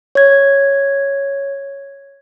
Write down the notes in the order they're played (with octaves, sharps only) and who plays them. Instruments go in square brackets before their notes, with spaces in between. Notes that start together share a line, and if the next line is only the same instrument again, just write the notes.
[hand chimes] C#5 G#6